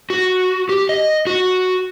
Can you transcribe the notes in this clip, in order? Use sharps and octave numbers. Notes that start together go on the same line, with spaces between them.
F#4
G4
D#5
F#4